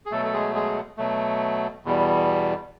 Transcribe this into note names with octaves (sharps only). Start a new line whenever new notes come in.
G#4
B2 F#3 A3 A4
A4
G#3 G#4
G#3 G#4
B2 F#3 A3
E2 B2 G3